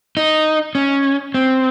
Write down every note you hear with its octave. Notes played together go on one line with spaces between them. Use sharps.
D#4
C#4
C4